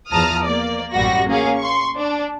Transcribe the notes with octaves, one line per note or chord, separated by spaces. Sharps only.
E2 F3 A5 A#5 D#6 F6
A#3 D5
A1 F#2 G3 F#4 A#6
A#3 C#4 G#4 F5
C6 C#6
D4